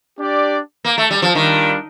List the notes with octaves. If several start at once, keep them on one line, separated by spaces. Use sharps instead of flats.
D4 G4 D5
A#3
A3
G3
F3
D#3 G3 D4 F4 A#4